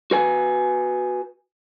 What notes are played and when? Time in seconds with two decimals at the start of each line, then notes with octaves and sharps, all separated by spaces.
0.11 F#4 B4 G#5